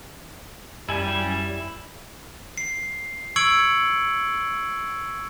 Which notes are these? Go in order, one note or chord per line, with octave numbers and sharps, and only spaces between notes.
F#2 G3 E4 G#5
C7
C#6 E6 G#6 C#7 D7 F#7